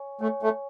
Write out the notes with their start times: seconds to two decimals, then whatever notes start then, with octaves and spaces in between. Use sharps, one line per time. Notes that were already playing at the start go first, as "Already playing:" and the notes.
Already playing: C#5 G#5 C#6
0.21 A3 C#5 G#5 C#6
0.43 A3